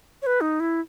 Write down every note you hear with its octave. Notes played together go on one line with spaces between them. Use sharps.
C#5
B4
D#4
E4